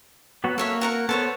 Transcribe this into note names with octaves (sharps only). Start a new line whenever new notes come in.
F#3 B3 F#4
A#3 A4 C#5 E5
F#4 A#4 F#5
B3 A4 C5 C#5